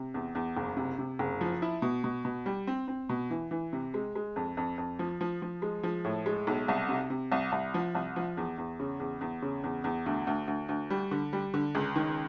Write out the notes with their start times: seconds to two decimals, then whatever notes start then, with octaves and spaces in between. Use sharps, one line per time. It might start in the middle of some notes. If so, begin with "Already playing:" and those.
Already playing: C3
0.14 E2
0.35 E2
0.57 F#1
0.77 C3
0.99 C3
1.19 F#1
1.41 F3
1.62 E4
1.82 B2
2.04 B2
2.25 B2
2.46 G3
2.67 C4
2.88 C4
3.09 B2
3.30 E3
3.51 E3
3.73 C3
3.94 G#3
4.15 G#3
4.36 F2
4.57 F2
4.78 F2
4.99 F3
5.21 F3
5.42 F3
5.62 G#3
5.83 F3
6.05 A2
6.26 G#3
6.47 B1
6.68 C2
6.89 C3
7.10 C3
7.32 C2
7.52 C2
7.74 F3
7.95 C2
8.16 F3
8.37 E2
8.58 E2
8.80 C#3
9.00 E2
9.21 E2
9.42 C#3
9.64 E2
9.84 E2
10.06 D2
10.27 D2
10.48 D2
10.69 D2
10.90 G3
11.11 D3
11.33 G3
11.54 D3
11.75 C#2
11.96 D#3